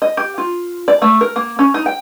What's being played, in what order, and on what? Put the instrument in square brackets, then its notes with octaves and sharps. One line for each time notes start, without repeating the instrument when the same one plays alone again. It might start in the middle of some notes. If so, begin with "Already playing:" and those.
[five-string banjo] D#5
G4
F4
D5
A3
A#4
A#3
C#4
D#4
G5